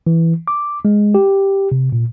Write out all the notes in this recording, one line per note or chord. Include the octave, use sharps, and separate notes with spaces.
E3
D6
G#3
G4
C3
A#2